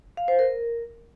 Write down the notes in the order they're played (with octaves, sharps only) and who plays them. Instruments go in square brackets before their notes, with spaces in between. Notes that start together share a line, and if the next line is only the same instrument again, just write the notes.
[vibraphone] F5
C5
A#4